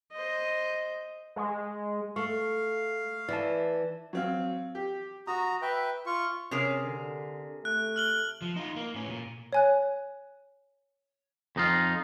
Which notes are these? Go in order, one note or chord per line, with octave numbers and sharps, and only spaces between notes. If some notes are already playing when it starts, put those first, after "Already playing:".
C5 D#5
G#3
A3 F5 C#6
E3 D5 E5 A5
F#3 C4 F5
G4
F#4 A#5 D#6
B4 E5 G5
F4 C#6
C3 C#4 G#4 A#4
D3
A3 F#6
F6 F#7 G7
F3
D#4 F4
A#3
A2 C#4
A#2
C#5 G#5 F#6
F2 D#4 F4